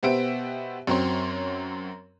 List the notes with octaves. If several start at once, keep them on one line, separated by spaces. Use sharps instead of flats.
B2 B3 G4 C5 E5 D7
F#2 F#3 C4 C#5 C6